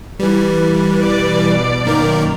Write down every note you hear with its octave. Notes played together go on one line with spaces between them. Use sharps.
E3 G3 B4
B2 D5
F#2 D#3 A#3 A#4